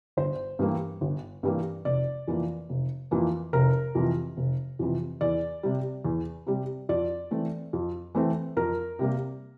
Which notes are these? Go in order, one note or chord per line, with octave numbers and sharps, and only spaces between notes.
G1 C5
G2 E3 G3 A#3
G1
G2 E3 G3 A#3
F1 D5
F2 E3 A#3
F1
F2 E3 A#3
F1 A#4
F2 C3 E3
F1
F2 C3 E3
E2 D5
C3 G3
E2
C3 G3
F2 D5
E3 A3 C4
F2
E3 A3 C4
F2 A#4
C3 G3 A#3